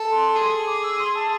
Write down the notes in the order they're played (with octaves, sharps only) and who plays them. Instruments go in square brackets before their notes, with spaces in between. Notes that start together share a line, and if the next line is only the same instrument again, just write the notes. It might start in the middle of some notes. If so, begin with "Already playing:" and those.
Already playing: [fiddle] A4
[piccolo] C6
[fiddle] G#4 [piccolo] C6
[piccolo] D6
E6
C6
A5